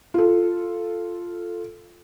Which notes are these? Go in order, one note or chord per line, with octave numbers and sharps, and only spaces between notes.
F4 A4